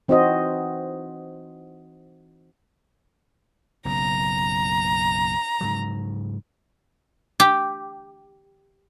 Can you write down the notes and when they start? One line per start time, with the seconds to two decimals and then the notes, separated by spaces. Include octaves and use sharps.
0.08 E3 C4 D#4 F#4 C5 D#5
3.85 F#1 B1 C#3 A#5
5.61 G#2 C#3 F#3
7.40 G4